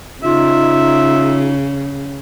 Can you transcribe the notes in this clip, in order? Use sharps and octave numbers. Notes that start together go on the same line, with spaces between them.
C#3 D#4 F4 E5